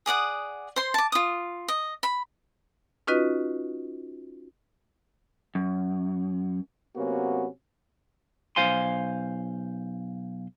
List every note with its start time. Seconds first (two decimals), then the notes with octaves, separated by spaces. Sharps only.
0.06 G#4 D5 F#5 D#6
0.76 C5 C6
0.94 A5 D6
1.12 F4 D#6
1.68 D#5
2.03 B5
3.07 C#4 D#4 F4 F#4 B4 D#5
5.55 F#2
6.96 C3 F#3 A#3 B3 C#4 F#4
8.56 B1 C5 F5 G#5 C6